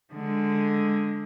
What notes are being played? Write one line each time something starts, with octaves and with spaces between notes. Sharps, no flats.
D3 G#3